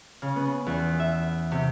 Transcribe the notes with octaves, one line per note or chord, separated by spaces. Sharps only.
C#3
B3
E2
E5
C3